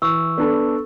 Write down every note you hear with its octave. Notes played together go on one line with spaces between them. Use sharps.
E3 C#6 E6
B3 D4 A4